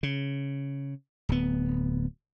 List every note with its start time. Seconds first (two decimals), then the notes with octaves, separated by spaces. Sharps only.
0.03 C#3
1.29 D1 B3